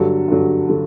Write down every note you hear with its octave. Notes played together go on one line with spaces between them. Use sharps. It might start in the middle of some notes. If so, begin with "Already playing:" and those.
Already playing: G2 D3 F#3 A4
G2 D3 F#3
D3 F#3